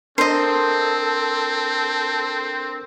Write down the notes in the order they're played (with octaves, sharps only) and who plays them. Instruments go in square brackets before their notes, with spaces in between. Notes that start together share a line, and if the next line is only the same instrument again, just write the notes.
[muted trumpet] C4 [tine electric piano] D4 A#4 [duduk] A4 [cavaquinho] C5 D#5